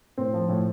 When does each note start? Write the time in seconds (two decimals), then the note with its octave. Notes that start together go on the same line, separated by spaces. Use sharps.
0.18 A2 C4
0.33 F3
0.49 A2